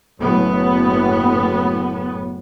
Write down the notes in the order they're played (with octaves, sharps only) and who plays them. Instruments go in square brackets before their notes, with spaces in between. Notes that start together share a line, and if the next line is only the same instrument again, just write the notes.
[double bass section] F#1 A2 B3